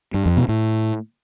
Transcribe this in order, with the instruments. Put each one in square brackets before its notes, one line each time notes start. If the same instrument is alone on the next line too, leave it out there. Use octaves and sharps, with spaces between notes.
[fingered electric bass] G2
F2
B2
A2